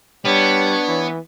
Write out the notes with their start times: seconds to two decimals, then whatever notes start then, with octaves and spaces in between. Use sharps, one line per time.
0.25 G3 B3 D4 C#5
0.88 E3